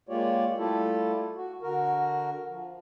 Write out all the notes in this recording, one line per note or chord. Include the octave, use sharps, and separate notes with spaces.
G#3 A#3 F4 G4 C#5 D5
G3 A3 E4 F4 G4 A4
F#4
D3 F#4 A#4
F3